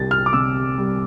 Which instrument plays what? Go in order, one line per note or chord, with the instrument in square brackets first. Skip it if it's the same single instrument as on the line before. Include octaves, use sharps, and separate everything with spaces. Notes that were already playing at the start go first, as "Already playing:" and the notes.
Already playing: [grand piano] C2 G3 A6
F6
D6
C3 E6
G3